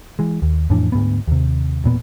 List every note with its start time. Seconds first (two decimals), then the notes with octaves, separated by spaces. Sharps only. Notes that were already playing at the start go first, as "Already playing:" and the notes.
0.19 E3 G#3
0.42 D#2
0.70 F2 A2 E3 D4
0.92 D2 G#2 A#3 B3
1.28 D#2 C3
1.84 E1 A#2 B3